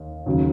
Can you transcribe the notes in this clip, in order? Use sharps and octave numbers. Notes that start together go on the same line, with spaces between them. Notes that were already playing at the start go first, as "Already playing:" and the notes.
Already playing: D#2 D#3
D#2 C#3 F#3